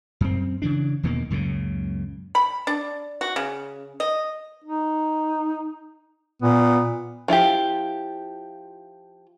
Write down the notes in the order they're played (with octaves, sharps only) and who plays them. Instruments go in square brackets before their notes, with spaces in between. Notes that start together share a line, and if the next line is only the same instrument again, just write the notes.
[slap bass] F#2 C4
C#3 E3 D4
E2 B2 D#3 A#3
C#2 F#2 A#2 C#3
[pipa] B5
D4
F#4
C#3
D#5
[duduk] D#4
[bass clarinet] A#2 [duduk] B3
[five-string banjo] F3 E4 F4 G4